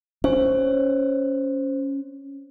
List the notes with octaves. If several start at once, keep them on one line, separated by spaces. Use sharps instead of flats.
C#4 C5